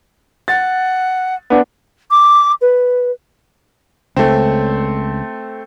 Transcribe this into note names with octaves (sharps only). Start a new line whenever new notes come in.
F#5 A6
B3 D4
D6
B4
C#2 A3 C4